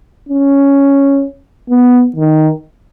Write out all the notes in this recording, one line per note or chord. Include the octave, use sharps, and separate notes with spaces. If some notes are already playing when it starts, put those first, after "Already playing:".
C#4
B3
D#3